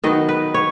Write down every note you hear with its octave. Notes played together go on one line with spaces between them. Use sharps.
D#3 F#3 B3 D#4 D#5
B4
C#5